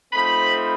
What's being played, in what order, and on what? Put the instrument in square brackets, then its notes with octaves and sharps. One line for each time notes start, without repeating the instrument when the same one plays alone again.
[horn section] F3 A3 C4 D#4 B5